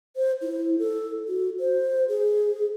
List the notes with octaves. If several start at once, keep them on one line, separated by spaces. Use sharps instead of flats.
C5
E4
A4
F#4
C5
G#4